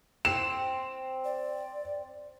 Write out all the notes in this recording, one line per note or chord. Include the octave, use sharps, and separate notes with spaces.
C4 E7
D5